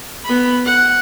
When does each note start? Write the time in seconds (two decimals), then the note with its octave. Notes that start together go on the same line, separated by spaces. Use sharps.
0.25 B3 B5
0.65 F#5